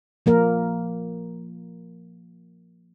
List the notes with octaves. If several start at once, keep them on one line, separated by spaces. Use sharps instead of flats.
F3 A#3 A#4